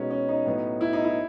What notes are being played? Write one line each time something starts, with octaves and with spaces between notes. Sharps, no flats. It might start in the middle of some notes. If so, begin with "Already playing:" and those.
Already playing: B2 G#3 B3 C#4 D#4
C#4
D#4
A2 F#3 B3
E4
D#4
E4